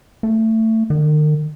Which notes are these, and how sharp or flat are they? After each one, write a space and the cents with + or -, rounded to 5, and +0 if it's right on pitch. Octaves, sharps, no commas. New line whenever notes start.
A3 +20
D#3 -40